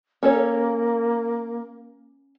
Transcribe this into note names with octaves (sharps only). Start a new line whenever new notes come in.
A#3 C#4 A4 C#5